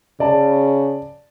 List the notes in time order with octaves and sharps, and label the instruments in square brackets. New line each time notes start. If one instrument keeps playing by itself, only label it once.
[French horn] C#3 [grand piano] D5 A5